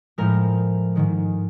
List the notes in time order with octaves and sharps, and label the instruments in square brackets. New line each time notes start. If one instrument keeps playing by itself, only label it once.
[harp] A2 F3 G#3 A#4
G#2 D#3 G#3